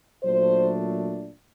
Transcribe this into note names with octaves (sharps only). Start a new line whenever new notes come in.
A#2 F#3 A3 D4 C5